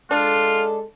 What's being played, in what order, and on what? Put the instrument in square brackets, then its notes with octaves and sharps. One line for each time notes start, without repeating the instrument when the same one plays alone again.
[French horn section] G#3 A4 [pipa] D4 [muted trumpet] F4